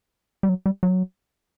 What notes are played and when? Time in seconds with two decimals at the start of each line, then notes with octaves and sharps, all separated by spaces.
0.43 G3
0.49 F#3
0.66 G3
0.83 F#3